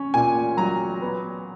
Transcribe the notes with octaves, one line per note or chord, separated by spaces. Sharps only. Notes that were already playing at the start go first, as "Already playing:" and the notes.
Already playing: C#4
A#2 G#5
F#3 A#5
B3